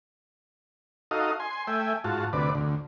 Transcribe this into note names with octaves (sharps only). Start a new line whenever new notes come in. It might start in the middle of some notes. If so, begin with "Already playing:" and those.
D#4 F#4 A4 D#5 F5
G#5 C6
A3 E5 G5 G#5
G#2 F4 F#4 A5
D2 C3 B4 D5
D2